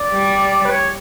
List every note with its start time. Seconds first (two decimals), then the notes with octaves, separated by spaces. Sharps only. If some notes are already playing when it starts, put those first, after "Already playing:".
Already playing: D5
0.12 G3 G4
0.65 B4
0.71 C#5